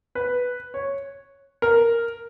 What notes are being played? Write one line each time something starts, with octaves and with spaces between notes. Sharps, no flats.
B4
C#5
A#4